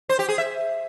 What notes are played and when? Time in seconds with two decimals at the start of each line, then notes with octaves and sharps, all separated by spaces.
0.09 C5
0.19 G4
0.29 G#4
0.38 E5